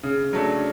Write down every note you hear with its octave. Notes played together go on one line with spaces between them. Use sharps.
C#3
F#3 A3 D4